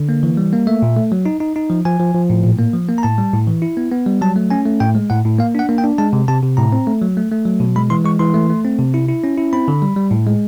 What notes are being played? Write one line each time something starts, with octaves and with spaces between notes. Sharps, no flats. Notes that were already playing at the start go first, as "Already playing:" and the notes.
Already playing: D3
A#3
E3
G3
A#3
A3 E5
A#2
A3
F#3
D#4
D#4
D#4
F3
F3 G#5
F3
F3
A2
A#2
A#3
F3
A#3
A#5
A2 A5
G3
A2
E3
E4
B3
B3
G3
F#3 A5
A3
C#4 G#5
A3
A2 G5
G#3
A2 F#5
A2
A#3 F5
D4 F#5
A#3
G5
D4
G#3 A5
C3
C3 A5
C3
A2 A#5
C4
A3
F#3
A3
A3
F#3
B2
G#3 B5
E3 C6
G#3 C#6
E3 C6
A3
A3
C4
C3
E4
E4
C#4
E4
C4 B5
D3
G3
G3
A2
G#3